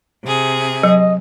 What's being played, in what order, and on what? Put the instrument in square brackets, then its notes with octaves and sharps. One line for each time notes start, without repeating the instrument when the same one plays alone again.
[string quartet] C3 G#4
[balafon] F#3 [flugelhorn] D#5